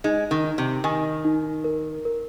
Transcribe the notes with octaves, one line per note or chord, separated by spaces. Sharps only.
G#3 D#4
D#3
D#4
C3
D#3 G#5
D#4
A#4
A#4